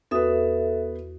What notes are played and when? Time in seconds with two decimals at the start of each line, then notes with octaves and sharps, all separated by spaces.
0.11 E2 B3 F#4 A4 B4 E5 D#6